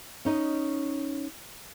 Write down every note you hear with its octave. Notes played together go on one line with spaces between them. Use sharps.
C#4 D#4 D#5